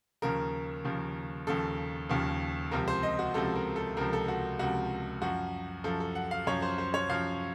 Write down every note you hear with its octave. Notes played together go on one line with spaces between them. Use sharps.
D#2 C#3 F3 A#4
D#2 C#3 F3
D#2 C#3 F3 A4
D#2 C#3 F3
C#2 C3 F3 A#4
C5
D#5
F#4
C#2 C3 F3 A4
A#4
A4
C#2 C3 F3 A#4
A4
F#4
C#2 C3 F3 F#4
F#2 F3 F#4
F#2 F3 A4
A4
F#5
F5
F#2 F3 C#5
C5
C5
C#5
F#2 F3 F5